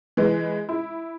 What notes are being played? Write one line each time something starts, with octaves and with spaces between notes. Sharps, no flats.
E3 G#3
E4